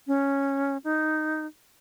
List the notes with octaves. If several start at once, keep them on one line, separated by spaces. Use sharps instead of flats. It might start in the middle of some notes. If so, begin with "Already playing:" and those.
C#4
D#4